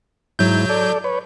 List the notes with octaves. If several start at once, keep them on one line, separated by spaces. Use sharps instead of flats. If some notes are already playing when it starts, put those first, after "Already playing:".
G#2 F#3 E4 G6
A4 D5
B4 C#5